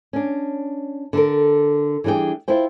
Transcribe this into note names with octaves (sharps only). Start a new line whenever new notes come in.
C#4 D4
D3 A4 A#4
E3 G3 D4 G#4 G5
E4 F4 C5 G5